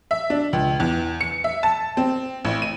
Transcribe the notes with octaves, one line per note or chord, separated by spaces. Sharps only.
E5
D4
C#2
E2
C#7
E5
A5
C4
A1
D#7